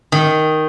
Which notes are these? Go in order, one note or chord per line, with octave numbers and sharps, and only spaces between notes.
D#3